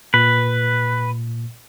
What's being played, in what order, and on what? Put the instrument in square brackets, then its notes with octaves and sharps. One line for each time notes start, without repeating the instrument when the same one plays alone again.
[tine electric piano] A#2 [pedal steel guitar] B4